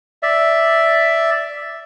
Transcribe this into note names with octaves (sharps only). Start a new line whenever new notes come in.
D5 E5